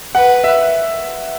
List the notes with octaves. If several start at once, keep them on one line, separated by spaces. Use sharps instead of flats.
B4 F#5
E5